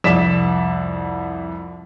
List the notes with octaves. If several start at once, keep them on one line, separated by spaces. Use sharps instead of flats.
C2 F2 D5 B6 E7